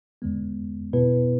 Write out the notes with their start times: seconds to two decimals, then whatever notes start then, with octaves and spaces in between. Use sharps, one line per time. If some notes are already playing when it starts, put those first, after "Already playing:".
0.22 E2 D3 G#3 B3
0.93 B2 B3 E4 B4